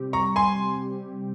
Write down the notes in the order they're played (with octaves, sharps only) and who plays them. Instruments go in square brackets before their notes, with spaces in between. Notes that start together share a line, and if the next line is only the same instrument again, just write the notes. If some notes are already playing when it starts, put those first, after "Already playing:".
Already playing: [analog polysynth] C3 G3 C4 G4
[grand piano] A#5 C#6
G#5 C6